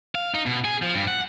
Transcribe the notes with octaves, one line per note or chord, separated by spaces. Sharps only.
F5
D#4
B2
G#4
F3
G2
F#5